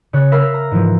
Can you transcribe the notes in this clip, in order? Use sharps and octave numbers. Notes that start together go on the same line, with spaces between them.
C#3 C#5 F#6
A#4 E5 F5 B5 C7
A#5
G#2 E3 F3